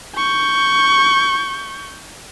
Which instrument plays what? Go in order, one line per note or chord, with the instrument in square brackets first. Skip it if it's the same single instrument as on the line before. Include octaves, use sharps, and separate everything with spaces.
[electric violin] C#6 G6